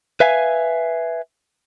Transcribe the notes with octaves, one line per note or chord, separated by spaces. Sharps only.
B4 E5 F5 G#5